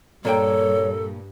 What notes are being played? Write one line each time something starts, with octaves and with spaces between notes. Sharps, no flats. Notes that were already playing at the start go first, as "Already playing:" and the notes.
G2 A#2 A#3 A4 C#5 G5